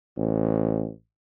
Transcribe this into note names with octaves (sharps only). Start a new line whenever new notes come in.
A1